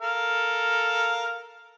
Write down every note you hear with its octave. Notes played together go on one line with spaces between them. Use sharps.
A4 A#4 F5